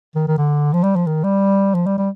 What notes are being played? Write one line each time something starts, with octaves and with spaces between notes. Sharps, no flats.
D#3
D#3
D3
F3
G3
F3
D#3
G3
F3
G3
G3